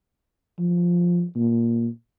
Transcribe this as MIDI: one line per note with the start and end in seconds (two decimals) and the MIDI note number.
0.59 1.23 53
1.35 1.87 46